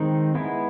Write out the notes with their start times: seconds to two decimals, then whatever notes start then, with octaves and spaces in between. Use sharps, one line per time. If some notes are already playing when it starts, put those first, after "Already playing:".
Already playing: D#3 G#3 C4 D#4
0.35 G#3 B3 E4